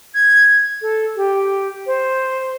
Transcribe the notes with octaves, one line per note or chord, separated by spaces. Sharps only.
G#6
A4
G4
C5